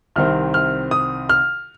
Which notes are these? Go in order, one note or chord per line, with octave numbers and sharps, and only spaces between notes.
C2 C3 D#3 C4 F6
F6
D#6
F6